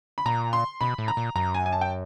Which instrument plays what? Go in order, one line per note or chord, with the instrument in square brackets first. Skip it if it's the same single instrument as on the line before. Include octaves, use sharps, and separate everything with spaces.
[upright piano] B5
[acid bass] A#2 [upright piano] A#5
[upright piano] C6
[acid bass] B2 [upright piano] B5
[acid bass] A2
[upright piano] A#5
[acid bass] A#2
[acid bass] F#2 [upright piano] A#5
[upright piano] G#5
G#5
A5
G5